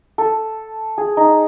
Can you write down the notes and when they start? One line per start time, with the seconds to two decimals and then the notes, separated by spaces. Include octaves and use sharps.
0.18 A4
0.98 G#4
1.17 D#4